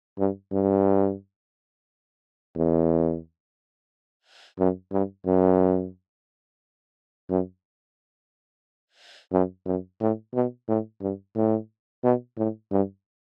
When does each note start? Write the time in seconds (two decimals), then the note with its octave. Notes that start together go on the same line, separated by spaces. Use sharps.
0.19 G2
0.52 G2
2.56 E2
4.59 F#2
4.92 G2
5.26 F#2
7.30 F#2
9.32 F#2
9.66 F#2
10.01 A2
10.34 B2
10.68 A2
11.01 G2
11.36 A2
12.04 B2
12.38 A2
12.71 G2